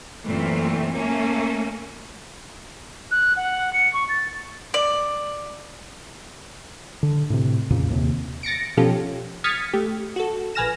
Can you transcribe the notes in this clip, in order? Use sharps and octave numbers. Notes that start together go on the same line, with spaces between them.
F#2 A#2 E3 A3 C4
A3 A#3 C#4
F#6
F#5
C#7
C#6
A6
D5
D3
A2 C3
F2 A#2 C#3
D#2 C3
A6 A#6 C#7 D7
B2 F3 C#4 F4 G4 A4
D#6 F6 G#6 A6 B6 C#7
A3 G4
F#4 A4
A#1 B4 G#5 F6 A#6 E7